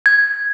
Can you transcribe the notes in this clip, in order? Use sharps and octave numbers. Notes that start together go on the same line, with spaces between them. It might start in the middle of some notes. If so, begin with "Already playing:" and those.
G#6